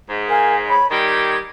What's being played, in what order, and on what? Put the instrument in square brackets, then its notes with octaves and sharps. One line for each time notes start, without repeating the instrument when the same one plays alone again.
[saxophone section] G#2
[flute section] A#4 F5 G#5
C#5 B5
[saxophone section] D#3 G3 G4 [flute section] G#6